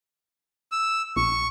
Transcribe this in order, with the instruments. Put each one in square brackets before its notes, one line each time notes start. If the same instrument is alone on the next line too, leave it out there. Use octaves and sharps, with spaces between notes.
[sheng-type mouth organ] E6
[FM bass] A#1 [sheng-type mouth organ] C#6